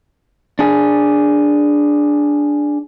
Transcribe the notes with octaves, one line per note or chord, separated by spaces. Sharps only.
D4 G#4